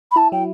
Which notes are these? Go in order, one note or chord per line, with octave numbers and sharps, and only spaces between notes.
B5
E4 A5
F#3 G5